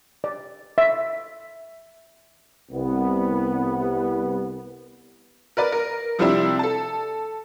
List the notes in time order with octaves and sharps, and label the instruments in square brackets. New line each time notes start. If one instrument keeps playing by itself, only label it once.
[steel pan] D5
E5
[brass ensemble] C2 B3
[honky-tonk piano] A#4 B4 D5
A#4
C3 F3 G3 C4 D4 E4
A4 A5